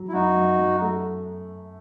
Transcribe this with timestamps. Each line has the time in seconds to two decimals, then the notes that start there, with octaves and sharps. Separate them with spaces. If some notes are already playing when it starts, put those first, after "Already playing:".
Already playing: F#3
0.08 E4
0.13 F#2 D#4 F#4
0.36 F#2
0.59 F#2
0.82 A3